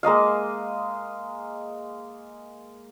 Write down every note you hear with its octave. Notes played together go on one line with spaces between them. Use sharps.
G#3 A#3 D#5 F5